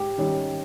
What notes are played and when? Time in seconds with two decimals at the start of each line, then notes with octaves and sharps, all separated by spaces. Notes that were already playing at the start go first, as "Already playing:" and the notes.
Already playing: G#2 G4
0.18 D#3 G3 C#4